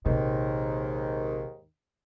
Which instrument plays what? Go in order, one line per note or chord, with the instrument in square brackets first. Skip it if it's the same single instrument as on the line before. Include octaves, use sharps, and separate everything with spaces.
[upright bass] A#1 C3 [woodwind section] D#2 G#2 D#3